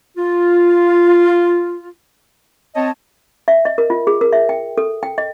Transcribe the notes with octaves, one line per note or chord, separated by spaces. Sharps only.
F4
C4 C#5 D#5 A5
E5
D#5
A#4
F4
G#4
A#4
E5
G5
A4
G5
D#5